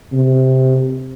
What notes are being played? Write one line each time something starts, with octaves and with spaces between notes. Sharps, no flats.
C3